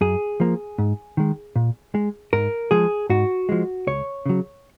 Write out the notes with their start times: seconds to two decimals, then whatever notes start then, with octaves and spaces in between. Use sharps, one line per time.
0.01 F#2 G#4
0.40 F3 A#3
0.78 G#2
1.17 D#3 G#3
1.56 A#2
1.95 G#3
2.33 G#2 A#4
2.71 F3 G#3 G#4
3.09 G#2 F#4
3.49 F3 G#3
3.87 C#2 C#5
4.26 C#3 F#3